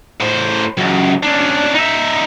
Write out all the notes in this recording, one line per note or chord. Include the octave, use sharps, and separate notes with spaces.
A2 C5
C#2 F#2
C#4 D4
D#4 E5